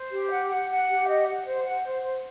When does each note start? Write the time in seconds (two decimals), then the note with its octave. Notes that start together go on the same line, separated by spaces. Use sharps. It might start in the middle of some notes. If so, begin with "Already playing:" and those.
Already playing: C5
0.12 G4
0.30 F#5
0.49 F#5
0.69 F#5
0.88 G4
1.07 D#5
1.26 F#5
1.45 C5
1.64 F#5
1.84 C5
2.02 C5